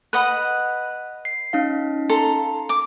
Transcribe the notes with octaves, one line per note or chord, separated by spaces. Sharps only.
B4 D#5 F#5 B5 F#6
C7
C#4 D#4 F5
A4 A#5 C6
D6